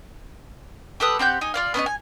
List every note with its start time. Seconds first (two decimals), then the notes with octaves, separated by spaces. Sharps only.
1.00 G4 A4 B4 D#6
1.19 C4 G4 F#5 G6
1.41 D#4 G#5
1.54 F4 D5 F5
1.74 B3 C#4 A4 D#5
1.86 G#5